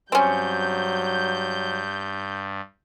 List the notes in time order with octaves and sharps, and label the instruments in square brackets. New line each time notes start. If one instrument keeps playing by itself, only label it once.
[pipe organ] G2 [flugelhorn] F#3 [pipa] C4 C#4 [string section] G6